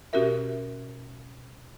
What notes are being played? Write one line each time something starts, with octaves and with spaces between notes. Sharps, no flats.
B2 C#4 F#4 G4 A#4 E5